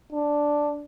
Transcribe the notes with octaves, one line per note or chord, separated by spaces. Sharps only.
D4